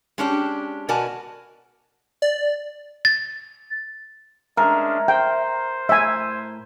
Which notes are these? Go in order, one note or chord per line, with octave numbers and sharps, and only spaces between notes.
G#3 C#4 D4 G4
B2 F#4 A#4 D5 G#5 A5
D5
A6
G#3 C#4 D4 A#4 E5
C5 G5
A2 E5 G#5